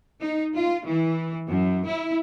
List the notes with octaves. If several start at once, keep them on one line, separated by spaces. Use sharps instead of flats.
D#4
F4
E3
F#2
E4